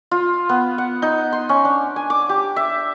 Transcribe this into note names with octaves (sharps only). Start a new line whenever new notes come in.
F4
B3
F#5
D#4
C6
C#4
D4
G#5
D6
G4
E5